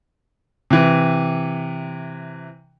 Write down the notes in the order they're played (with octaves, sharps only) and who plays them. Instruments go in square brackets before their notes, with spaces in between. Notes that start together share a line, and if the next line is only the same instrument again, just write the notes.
[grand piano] C3 E3